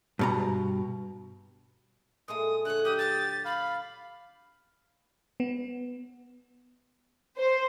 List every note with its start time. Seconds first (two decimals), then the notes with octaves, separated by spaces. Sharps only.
0.19 G2 B2 A#5
2.28 A#2 G#3 A3 D#6
2.65 D3 C#5 F#6
2.85 F#3 G4 D#6
2.98 A6
3.45 F5 B5
5.40 B3
7.38 C5